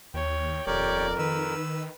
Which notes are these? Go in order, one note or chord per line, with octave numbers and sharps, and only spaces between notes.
D#2 C#5 G5
D#1 F2 G4 A#4 C#5 D5
D#3 B4 E6